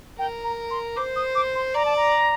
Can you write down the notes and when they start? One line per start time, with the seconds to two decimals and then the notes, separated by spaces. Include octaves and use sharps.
0.18 A#4 G5
0.44 A#5
0.71 C6
0.96 C5 D6
1.16 D#6
1.35 D6
1.55 C6
1.74 D5 A#5
1.85 A5
1.97 A#5